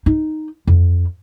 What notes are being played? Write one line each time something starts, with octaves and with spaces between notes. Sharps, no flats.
D#4
F2